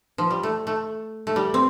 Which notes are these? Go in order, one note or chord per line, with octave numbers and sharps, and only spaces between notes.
F3
G3
A3
A3
A3
G3
C4